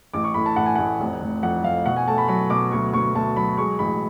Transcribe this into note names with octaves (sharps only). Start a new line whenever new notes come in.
A1 D6
C#6
A2 B5
A5
A1 F#5
G#5
A1 F#5
F1
F1
F2 F#5
F2 F5
B2 F#5
G#5
A3 A5
B5
F#3 B5
B2 D6
D2 C#6
D2 C#6
D2 A5
F#3 B5
G#3 C#6
A1 B5